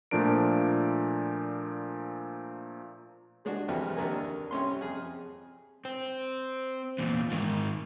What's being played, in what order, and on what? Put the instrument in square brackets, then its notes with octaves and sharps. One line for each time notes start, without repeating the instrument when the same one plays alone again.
[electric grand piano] A#2 F3 A3 D4 A#4 D7
[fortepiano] G3 G#3 D4 F#4
C2 F2 E3
D#2 D4 A#4 G#5
C2 C#4 C6
F2 G#4
[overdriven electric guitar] C4
E2 A#2
G#2 D#3